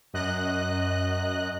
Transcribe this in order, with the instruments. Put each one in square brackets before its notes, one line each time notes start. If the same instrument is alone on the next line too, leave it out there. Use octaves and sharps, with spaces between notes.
[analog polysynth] F#2 D#5 F#6